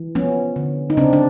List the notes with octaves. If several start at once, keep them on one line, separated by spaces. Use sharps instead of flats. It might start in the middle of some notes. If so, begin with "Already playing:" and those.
Already playing: E3
F3 B3 C#4
D3
D#4
C#3 C4 D4
D4